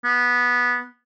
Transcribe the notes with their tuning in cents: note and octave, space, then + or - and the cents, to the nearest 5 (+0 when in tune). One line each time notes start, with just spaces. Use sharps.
B3 -10